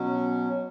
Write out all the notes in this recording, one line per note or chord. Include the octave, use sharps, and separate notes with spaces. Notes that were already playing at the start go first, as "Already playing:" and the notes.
Already playing: B2 F#3 C#4